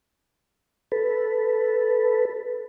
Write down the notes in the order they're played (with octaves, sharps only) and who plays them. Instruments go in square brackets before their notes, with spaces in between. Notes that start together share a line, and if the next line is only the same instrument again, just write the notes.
[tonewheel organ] A4 B4